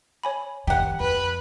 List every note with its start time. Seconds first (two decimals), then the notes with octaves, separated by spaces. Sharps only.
0.23 C#5 G#5 B5
0.67 F#2 D#3 G4 F#5
1.00 F2 B4